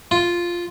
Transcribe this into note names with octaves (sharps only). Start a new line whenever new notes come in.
F4